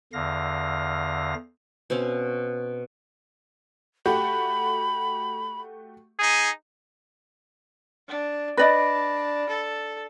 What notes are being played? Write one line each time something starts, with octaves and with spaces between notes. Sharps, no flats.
E2 D3 F5 A#6
B2 C4 C#4 F5
A3 F#4 G4 B5
D#4 G#4
D4
D4 B4 D5 D#5 B5 A#6
A4